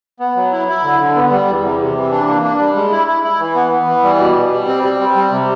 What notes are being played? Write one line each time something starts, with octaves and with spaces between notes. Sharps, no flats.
B3
F#3
E4
E4
D3
D3
B3
G3
E2
C3
C3
E3
D4
A#3
D4
G3
G#3
E4
E4
E4
E3
B3
B3
E3
G3
B2
B2
G3
C4
G3
C4
G3
C3